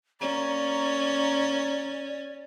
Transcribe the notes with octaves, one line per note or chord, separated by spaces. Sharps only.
A#3 C#4 D5 A#5 C#6